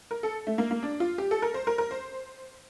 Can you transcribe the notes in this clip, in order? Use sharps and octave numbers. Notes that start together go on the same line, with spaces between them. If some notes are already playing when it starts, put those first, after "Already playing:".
A#4
A4
A3
A#3
A#3
D4
F4
G4
A4
A#4
C5
A#4
A#4
C5